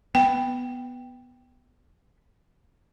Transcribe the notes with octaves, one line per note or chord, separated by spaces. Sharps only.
B3 G5